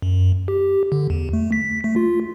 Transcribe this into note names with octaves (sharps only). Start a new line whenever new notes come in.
F#2
G4
D3
E2
A3
B6
A3
F4